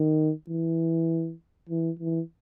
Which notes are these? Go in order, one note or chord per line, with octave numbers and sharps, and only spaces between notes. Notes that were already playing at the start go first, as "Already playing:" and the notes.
Already playing: D#3
E3
E3
E3